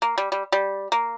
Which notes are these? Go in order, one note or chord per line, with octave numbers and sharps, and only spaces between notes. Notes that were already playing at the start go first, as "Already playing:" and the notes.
A#3
G3
G3
G3
A#3